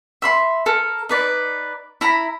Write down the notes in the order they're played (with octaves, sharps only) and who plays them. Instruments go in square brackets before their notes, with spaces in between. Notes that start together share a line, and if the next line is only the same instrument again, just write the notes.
[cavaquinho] E5 B5 C6
A4 A#4
D#4 B4 D5
E4 A#5 B5